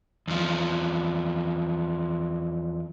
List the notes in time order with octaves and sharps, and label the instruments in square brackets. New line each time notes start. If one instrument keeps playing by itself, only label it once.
[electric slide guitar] E2 F3